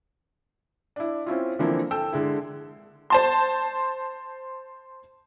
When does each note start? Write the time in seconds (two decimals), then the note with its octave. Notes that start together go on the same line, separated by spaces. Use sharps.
0.96 D4 E4
1.26 C4 C#4 E4 F4
1.59 D3 E3 F3 A#3 C4 E4
1.91 A4 G5 E6
2.13 D3 G#3 E4
3.10 C5 A5 C6